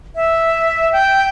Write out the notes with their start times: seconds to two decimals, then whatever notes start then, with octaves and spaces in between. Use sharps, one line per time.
0.16 E5
0.92 G5